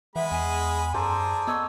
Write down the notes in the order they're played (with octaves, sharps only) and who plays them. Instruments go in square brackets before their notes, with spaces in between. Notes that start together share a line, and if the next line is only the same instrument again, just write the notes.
[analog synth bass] E3 [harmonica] G#3 G#4 B5 [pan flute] E5 [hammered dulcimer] F#5
[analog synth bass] E2 [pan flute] G#5
[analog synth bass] F#2 [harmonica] G#4 D5 [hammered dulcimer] A4 C5 A#5
[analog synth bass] B3 [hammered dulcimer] C#5 D#5 [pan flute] E6